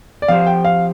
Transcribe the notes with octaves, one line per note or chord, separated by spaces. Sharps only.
D5
F3 C4 G4 C5 F5
G5
F5